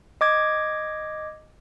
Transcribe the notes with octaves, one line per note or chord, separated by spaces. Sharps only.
D#5 D6 G#6